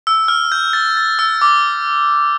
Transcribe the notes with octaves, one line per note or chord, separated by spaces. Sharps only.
E6
F6
G6
A6
A6
E6
D6